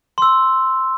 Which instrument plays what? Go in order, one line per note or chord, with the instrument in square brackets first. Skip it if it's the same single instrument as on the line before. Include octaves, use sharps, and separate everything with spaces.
[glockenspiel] C6 E6